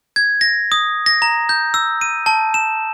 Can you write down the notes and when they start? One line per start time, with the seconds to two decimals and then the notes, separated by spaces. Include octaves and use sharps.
0.16 G#6
0.41 A#6
0.72 D#6
1.06 A#6
1.22 A#5
1.49 G6
1.74 E6
2.01 D#7
2.26 A5
2.54 E7